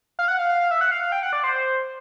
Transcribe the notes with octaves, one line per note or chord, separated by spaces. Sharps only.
F5
F#5
F5
F5
F5
E5
F#5
F5
F5
G5
F#5
D5
C5